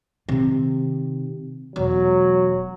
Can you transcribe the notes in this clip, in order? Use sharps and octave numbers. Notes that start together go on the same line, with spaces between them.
C3 D#3
E1 F#3